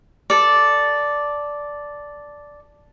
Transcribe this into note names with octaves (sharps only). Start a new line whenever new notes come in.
A4 D5